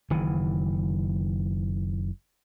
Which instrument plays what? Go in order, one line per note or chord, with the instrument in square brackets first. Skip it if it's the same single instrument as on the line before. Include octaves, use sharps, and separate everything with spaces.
[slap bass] F#1 D#3 E3